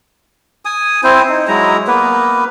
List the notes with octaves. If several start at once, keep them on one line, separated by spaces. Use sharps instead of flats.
G#5 D#6
C4 E4 C5
D#4
F#3 G#3 E4 A#5
A#3 B3 B4